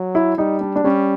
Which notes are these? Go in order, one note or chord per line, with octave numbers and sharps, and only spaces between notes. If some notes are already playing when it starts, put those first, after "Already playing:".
Already playing: F#3
E4
G3 D#4
D4
D4
G3 C#4